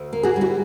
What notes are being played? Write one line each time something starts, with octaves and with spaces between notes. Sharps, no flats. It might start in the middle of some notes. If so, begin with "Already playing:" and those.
Already playing: D2
A#3
F#4 G#4
G3
E4 F#4